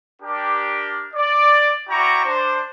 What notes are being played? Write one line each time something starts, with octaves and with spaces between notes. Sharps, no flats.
D4 G4 A#4
D5
E4 F#4 D5 G5 A#5 C#6
D4 C5